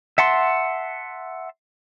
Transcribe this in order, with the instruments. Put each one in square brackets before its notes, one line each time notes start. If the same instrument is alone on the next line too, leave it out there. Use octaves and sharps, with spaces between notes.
[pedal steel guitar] E5 F#5 A5 C6